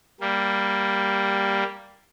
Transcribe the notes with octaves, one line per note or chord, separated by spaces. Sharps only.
G3 A#3